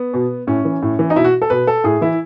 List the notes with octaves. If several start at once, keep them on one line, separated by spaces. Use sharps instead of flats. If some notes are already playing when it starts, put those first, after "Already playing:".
Already playing: B3
B2
A2 C#4
E3
A2
E3
D#4
B2 E4
F#4
A4
B2 B4
A4
A2 G#4
E3 E4